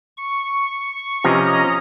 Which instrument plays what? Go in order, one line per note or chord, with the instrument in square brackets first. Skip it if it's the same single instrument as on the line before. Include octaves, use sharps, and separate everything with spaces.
[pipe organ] C#6
[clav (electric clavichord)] C3 F3 B4 [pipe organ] C#4 D#5 A#5